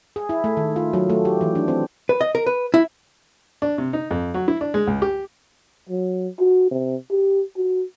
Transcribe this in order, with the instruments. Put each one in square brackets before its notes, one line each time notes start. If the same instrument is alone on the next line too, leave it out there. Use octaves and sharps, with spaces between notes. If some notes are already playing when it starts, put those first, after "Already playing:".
[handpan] G#4
E4
A3
D#3
F4
F#3
A3
G4
E3
D4
C4
[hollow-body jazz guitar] B4
D#5
A#4
B4
E4
[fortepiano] D4
C3
D#4
F2
F#3
E4
D4
G#3
C#2
G4
[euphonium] F#3
F#4
C3
G4
F#4